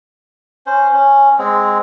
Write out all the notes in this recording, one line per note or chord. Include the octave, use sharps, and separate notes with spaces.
C#4 C5
C#4
G#3 C4